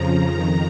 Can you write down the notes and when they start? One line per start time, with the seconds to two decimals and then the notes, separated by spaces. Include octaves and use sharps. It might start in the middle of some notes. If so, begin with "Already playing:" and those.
Already playing: F2 C#3 F3 A#5
0.29 F2 D#3 A#5